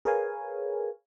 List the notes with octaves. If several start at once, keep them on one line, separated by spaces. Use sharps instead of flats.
G#4 A#4 B4 C#5 F5 G#5